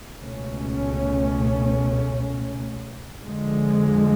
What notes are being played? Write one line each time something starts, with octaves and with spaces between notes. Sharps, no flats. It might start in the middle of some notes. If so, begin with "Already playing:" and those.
C#2 B2 A3 C#4
F2 D3 F3 G#3